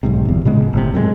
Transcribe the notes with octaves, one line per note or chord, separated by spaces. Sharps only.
B1 G#2 C3
G1 E2
A#2 C#3 G#3 B3
F#1
G1 A2 C3
F#2 C3 G3 G#3